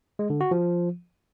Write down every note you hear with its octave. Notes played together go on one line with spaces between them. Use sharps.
G#3
D3
F#4
F3